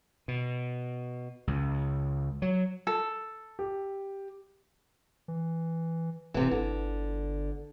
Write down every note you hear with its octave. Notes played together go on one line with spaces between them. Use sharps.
B2
C#2
F#3
A4
G4
E3
E1 C3 E3
G1 D3